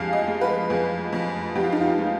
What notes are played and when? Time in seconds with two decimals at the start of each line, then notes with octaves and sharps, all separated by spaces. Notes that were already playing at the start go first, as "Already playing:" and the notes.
Already playing: F2 G#3 G4 G#4 F5
0.13 D#5
0.27 G#3
0.41 B4
0.70 F2 G#4
1.12 F2
1.55 F2 G4
1.63 F4
1.72 D#4
1.80 F4
1.98 G#3